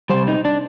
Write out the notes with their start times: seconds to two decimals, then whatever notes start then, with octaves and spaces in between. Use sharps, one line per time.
0.10 C3 G3 C5
0.28 D#4
0.45 D4